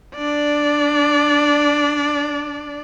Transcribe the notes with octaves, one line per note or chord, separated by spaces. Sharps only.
D4 D5